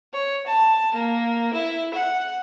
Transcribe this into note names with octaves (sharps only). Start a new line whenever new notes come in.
C#5
A5
A#3
E4
F#5